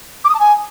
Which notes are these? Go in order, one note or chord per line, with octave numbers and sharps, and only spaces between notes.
D6
D#6
A5
G#5